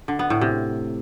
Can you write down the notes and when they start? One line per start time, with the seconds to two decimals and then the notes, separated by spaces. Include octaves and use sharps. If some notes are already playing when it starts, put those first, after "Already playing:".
0.08 D3
0.19 B3
0.30 A2
0.41 C3